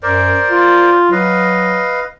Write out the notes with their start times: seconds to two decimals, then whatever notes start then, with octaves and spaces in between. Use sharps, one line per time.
0.03 F#2 A#4 C5 D5
0.50 F4
1.12 F#3 B4 D#5 F5